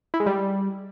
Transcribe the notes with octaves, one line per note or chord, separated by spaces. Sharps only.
E4
G#3
G3